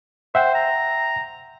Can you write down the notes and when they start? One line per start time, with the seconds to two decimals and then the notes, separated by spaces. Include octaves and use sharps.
0.35 C5 E5 F#5 G5
0.55 A#5